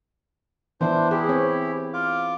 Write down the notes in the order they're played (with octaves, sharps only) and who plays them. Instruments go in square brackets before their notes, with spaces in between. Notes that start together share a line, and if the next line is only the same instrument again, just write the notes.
[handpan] E3 B3 E4 [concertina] D4 C5
[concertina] E4 G4 [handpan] G#4
[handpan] C4 C#5
[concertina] F4 F5 D6